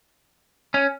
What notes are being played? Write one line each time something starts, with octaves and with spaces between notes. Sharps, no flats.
C#4